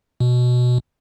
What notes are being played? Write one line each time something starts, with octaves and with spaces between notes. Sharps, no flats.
B2